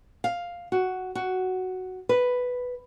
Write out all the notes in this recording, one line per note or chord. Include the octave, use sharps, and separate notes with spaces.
F5
F#4
F#4
B4